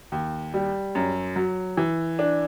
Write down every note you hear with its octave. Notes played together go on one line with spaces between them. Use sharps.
D#2
G3
F#2
F#3
E3
D4